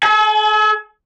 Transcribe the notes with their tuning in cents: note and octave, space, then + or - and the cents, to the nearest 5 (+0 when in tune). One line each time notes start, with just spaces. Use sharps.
A4 -40 G#5 +35